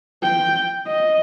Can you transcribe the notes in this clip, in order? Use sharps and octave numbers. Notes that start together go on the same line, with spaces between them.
G5
D#5